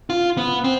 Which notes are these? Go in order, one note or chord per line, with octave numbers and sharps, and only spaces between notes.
F4
B3
C4